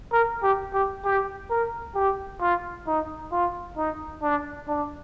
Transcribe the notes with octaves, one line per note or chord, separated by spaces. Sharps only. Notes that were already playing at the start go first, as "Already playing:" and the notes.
A#4
G4
G4
G4
A#4
G4
F4
D#4
F4
D#4
D4
D4